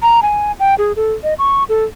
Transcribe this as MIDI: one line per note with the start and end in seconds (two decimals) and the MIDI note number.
0.02 0.20 82
0.23 0.52 80
0.60 0.75 79
0.78 0.92 68
0.96 1.13 69
1.24 1.34 75
1.39 1.64 85
1.69 1.85 69